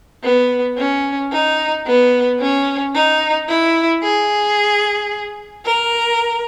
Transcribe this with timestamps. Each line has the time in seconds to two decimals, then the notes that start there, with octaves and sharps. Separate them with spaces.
0.23 B3
0.78 C#4
1.32 D#4
1.86 B3
2.40 C#4
2.95 D#4
3.48 E4
4.02 G#4
5.66 A#4